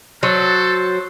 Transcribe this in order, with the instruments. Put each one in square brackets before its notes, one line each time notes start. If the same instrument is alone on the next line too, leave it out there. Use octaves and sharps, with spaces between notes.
[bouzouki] F#3 [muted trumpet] A4 [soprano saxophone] C5